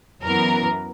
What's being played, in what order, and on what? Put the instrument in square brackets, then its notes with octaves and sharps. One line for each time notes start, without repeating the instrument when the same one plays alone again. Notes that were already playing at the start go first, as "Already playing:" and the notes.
[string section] F#2 E3 B3 A#4